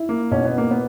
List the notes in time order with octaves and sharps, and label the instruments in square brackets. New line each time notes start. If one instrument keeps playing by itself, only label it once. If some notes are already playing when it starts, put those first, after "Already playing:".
Already playing: [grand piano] E4
[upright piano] A#3
[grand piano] B2 [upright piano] C#4
[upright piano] B3
A#3
B3